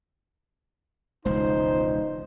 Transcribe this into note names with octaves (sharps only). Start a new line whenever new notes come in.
E1 C#2 F3 D#4 C5